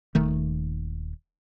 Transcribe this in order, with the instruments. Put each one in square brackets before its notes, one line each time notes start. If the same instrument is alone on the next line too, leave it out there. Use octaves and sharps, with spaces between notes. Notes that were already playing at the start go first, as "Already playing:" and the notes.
[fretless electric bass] D#1 D#3 A3